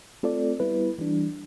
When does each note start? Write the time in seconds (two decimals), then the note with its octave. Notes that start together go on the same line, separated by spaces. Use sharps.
0.23 A3 C4 F4 A4 D5
0.60 G3 B3 E4 B4
0.98 E3 G3 D4